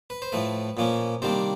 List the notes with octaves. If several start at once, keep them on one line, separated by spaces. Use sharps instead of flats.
B4
C5
A2 F3 A3 B4
A#2 F3 A#3 C#4
C3 D#3 G3 A#3 D4 C5